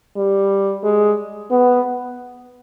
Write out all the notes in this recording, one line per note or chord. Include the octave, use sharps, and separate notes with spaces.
G3
G#3
B3